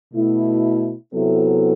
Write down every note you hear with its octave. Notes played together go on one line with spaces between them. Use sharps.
B2 A3 E4
C3 F#3 B3 E4 A4